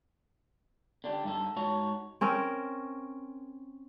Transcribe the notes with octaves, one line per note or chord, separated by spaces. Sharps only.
D3 D4 G4
G2 D#4 A4
G#2 D#4 F#4 C#5 A5
C4 C#4 A#4